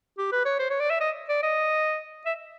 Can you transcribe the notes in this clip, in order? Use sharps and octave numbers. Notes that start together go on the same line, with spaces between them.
G4
B4
C#5
C5
C#5
D5
E5
D#5
D5
D#5
E5